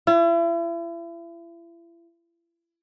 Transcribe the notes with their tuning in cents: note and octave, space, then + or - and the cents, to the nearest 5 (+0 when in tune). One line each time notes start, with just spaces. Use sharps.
E4 +40